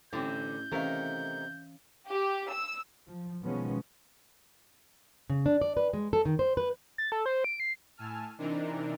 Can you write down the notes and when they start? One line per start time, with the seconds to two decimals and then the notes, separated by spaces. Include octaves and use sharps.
0.13 A1 D3 E3 C4 C#4 E4 G6
0.72 C3 D#3 E3 A3 C#4 A#4 F5
2.09 G4
2.50 E6
3.07 F3
3.42 B2 D#3 F3 G#3 B3 C#4
5.30 C#3
5.46 D4
5.62 D5
5.77 B4
5.93 G#3
6.13 A4
6.25 D#3
6.39 C5
6.57 B4
6.98 A6
7.12 A4
7.26 C5
7.44 D7
7.60 C7
7.97 A2 G#5 A5 E6 F6
8.38 C3 E3 D4 D#4 A#4